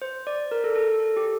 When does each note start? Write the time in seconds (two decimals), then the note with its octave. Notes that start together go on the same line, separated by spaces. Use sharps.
0.02 C5
0.27 D5
0.51 A#4
0.64 A4
0.75 A4
0.88 A4
1.00 A4
1.17 G4